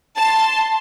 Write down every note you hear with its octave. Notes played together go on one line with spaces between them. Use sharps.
A5 C6